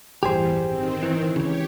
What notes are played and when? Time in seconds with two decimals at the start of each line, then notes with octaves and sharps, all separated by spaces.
0.23 A1 E2 G2 G3 G4 G#4 C5
0.65 D#3 C4
1.03 E3
1.36 C#2 C#3 G4 C#5